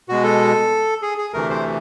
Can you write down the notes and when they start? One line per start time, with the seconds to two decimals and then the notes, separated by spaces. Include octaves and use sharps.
0.09 B2 G#3 F#4
0.24 A4
1.02 G#4
1.18 G#4
1.34 D2 C3 E3 A3 A#4
1.50 C5